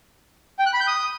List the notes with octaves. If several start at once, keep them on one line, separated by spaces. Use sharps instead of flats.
G5
F#6
B5
G6
D#6